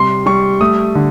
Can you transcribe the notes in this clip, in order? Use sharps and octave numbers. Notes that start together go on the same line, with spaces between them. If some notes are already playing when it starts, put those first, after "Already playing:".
Already playing: C3 G3 C6
G3 C#6
A3 D#6
D3